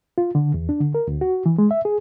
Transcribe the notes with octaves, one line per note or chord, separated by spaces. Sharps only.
F4
D3
E2
D4
D3
A#4
D2
F#4
E3
G#3
E5
G#4